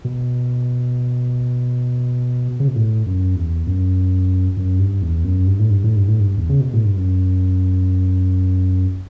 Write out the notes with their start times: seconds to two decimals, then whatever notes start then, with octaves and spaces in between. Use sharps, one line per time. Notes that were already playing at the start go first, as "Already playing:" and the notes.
0.05 B2
2.60 C#3
2.68 B2
2.76 A2
3.06 F#2
3.35 E2
3.67 F#2
4.57 F#2
4.79 G2
5.02 E2
5.24 F#2
5.47 G2
5.59 A2
5.70 G2
5.84 A2
5.96 G2
6.08 A2
6.20 G2
6.37 E2
6.50 C#3
6.60 B2
6.73 A2
6.85 G2
6.97 F#2